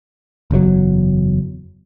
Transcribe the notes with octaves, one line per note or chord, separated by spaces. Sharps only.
F#1 E2 C3 F#3